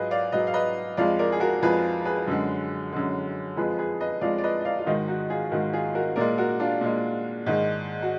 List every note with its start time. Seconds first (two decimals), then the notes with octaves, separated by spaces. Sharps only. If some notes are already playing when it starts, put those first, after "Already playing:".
Already playing: G#2 F#3 F4 G#4 B4 D#5
0.11 D5 F5
0.32 G#2 F#3 B4 D#5
0.47 F5
0.54 B4 D#5
0.97 F2 F3 G#3 D5 F5
1.19 A#4 D5
1.32 G#4
1.40 F#4 A#4
1.62 F2 F3 G#3 G#4 B4
2.05 G#4 B4
2.27 F#2 D3 G#3
2.93 F#2 D3 G#3
3.57 F2 F3 G#3 G#4 B4
3.78 G#4 B4
4.01 B4 D#5
4.21 F2 F3 G#3 D5 F5
4.38 D5
4.43 B4 D#5
4.61 D#5
4.65 D5 F5
4.79 F4
4.86 G#2 D#3 G#3 D#4 F#4
5.08 D#4 F#4
5.30 F4 G#4
5.51 G#2 D#3 G#3 F#4 A#4
5.73 F4 G#4
5.95 F#4 A#4
6.16 A#2 G#3 A#4 D5
6.38 F#4 A#4
6.60 D4 F4
6.81 A#2 G#3
7.46 G#2 D#3 G#3
8.02 F#4